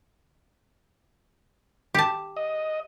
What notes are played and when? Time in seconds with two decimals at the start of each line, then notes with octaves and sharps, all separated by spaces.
1.94 G4 A5
2.36 D#5